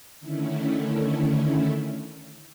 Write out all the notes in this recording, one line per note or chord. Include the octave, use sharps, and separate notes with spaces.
D3 D#3 A3 C#4 E4